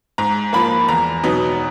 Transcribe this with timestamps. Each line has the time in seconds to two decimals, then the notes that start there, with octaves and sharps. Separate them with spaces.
0.18 G#2 A#5
0.53 F3 A#3 B5
0.88 E2 A#5
1.23 B2 F#3 B3 D#4